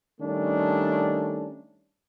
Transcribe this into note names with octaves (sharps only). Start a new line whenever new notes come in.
D#3 G3 A3 C#4 D4